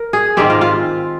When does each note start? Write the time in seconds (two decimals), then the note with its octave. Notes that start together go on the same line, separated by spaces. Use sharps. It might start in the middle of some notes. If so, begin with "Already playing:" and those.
Already playing: A#4
0.13 G#4
0.37 G#2 D#3 G#3 C4 G4
0.50 F4
0.61 F4